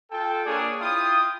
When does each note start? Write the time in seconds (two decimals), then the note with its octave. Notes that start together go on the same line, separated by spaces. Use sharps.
0.11 F4 A4 G5
0.45 A#3 D4 G#4 C#5 D5 G#5
0.80 E4 F4 G5 D#6